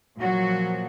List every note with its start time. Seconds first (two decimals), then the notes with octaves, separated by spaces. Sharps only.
0.19 A#2 F3 F#3 F#4